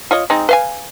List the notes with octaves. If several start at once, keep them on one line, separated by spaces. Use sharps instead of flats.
F4 C#5 D#5
G#3 C4 D#4
B4 F5 G#5